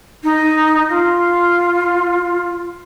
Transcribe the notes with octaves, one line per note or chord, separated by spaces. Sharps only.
D#4
F4